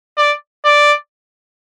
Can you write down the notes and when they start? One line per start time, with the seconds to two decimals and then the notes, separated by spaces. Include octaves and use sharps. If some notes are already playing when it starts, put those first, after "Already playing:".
0.18 D5
0.65 D5